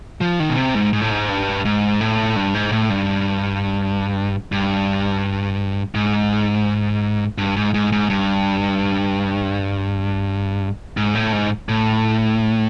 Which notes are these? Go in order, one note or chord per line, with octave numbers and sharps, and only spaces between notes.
F3
D#3
B2
C3
G#2
G#2
A2
G#2
G2
G#2
A2
G2
G#2
A2
G2
G2
G#2
G2
G#2
G#2
G#2
G2
G#2
A2
G#2
A2